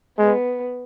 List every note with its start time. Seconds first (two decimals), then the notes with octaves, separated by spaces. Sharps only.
0.18 G#3 B3